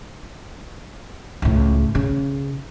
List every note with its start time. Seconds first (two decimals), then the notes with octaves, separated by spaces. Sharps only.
1.42 C#2 A2
1.95 C#3